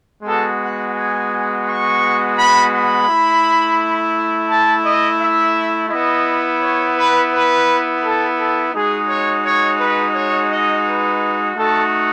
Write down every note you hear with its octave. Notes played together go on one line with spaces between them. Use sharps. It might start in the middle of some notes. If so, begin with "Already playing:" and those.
G#3 B3 F#4 A4
F#5
G#5
C#6
B5
B5
A3 E4
A5
D#5
E5
B3 E4 D#5
C#5
B4
B4
A4
A4
G#3 D#4 F#4 G#4
C#5
C#5
B4
C#5
D#5
B4
A3 D#4 F#4 A4